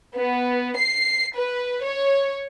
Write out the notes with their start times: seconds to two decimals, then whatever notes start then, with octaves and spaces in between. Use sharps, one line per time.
0.15 B3
0.77 C7
1.35 B4
1.84 C#5